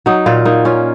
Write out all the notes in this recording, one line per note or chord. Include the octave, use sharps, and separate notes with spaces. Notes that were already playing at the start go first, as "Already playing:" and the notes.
F#3 D#4
A#2 F4
A#3 D#4
C#4 F4